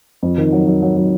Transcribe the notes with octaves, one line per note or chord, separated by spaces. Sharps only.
F2
D#3
F#3
F#3
F#3
F#3